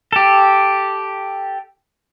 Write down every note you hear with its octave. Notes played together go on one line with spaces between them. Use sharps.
G4 A4